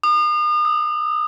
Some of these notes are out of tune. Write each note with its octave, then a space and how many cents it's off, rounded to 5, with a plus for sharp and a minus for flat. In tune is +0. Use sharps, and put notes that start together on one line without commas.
D#6 -40
D#6 +45